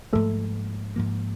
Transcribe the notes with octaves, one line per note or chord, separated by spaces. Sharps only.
G#2 F3 A3 A#3 A4
G#2 F3 A#3